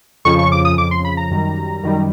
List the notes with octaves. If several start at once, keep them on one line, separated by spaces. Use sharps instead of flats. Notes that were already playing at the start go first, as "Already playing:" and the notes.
F2 C#3 F3 C#6
C#6
D6
D#6
F2 C#3 F3 D6
C6
B5
A#5
F#2 D#3 G3
F#2 D#3 G3